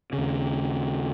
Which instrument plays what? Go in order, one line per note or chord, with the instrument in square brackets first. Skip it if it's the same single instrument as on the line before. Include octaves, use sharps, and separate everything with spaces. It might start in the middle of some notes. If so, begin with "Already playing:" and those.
[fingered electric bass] D#2 C#3